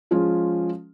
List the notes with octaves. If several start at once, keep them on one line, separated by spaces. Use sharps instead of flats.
F3 G#3 C#4 F4